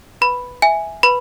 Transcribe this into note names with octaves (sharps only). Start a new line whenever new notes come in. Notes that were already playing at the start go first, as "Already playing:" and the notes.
B4 B5
E5 G#5
B4 B5